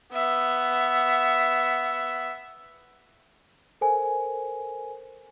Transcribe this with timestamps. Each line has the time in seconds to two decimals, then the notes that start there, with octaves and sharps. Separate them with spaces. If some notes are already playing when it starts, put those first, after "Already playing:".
0.12 B3 E5
3.81 A4 A#4 C5 G#5